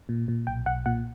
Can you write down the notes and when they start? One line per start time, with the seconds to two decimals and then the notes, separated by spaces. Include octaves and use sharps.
0.09 A#2
0.28 A#2
0.47 B1 G5
0.66 B1 F#5
0.86 A#2 F#5